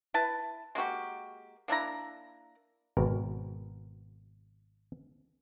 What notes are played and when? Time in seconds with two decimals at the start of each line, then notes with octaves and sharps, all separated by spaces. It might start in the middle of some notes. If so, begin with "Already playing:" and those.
0.14 E4 B4 A5
0.75 G#3 A#3 F#4 G4
1.68 A#3 D4 E4 A#5
2.97 G#1 B2 A#4